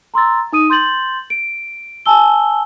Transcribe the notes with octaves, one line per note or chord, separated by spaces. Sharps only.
A#5 C6 E6 A6
D#4 D#6 D#7
C6 G6 A6 F#7
D7
G#5 A5 E6 G7